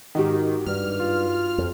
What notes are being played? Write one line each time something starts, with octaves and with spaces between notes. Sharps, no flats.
G#2 D#3 F#4 G4
G2 F6
F4
F2